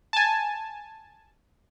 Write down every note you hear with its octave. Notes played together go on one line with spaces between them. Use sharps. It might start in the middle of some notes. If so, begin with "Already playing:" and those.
G#5 A5